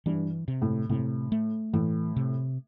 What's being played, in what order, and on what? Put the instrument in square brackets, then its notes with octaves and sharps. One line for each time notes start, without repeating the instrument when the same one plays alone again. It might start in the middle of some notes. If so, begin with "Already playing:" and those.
[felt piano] G2 [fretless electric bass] E3
[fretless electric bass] C3
[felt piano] A2
[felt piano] A2 [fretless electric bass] C3
[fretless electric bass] A3
[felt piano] A2 [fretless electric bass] E3
[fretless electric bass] C3